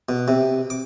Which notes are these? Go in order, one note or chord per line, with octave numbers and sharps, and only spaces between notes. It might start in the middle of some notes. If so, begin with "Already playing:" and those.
B2
C3
D6